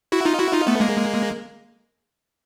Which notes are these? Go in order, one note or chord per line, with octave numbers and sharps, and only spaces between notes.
E4 F#4
D#4 F4
E4 F#4
D#4 F4
A3 B3
G#3 A#3